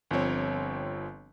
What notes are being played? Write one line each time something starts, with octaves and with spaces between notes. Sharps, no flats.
G1 F3 C4 C#5